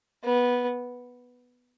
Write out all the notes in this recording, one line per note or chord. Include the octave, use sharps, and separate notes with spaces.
B3